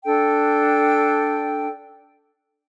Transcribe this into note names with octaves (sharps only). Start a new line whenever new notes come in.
D4 A4 G5